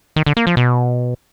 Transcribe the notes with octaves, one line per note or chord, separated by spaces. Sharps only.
D#3
D3
A#3
F3
B2